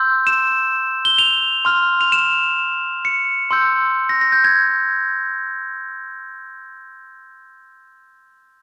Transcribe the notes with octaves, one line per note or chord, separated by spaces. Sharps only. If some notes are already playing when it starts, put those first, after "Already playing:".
Already playing: C6 E6 G6
E7
G7
F7
C6 F6
F7
E7
C#7
C6 E6 G6
A#6
A#6
G6
G#6